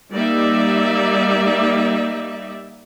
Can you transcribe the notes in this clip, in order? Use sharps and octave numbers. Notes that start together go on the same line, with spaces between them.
G3 A#3 D#4 D5 E5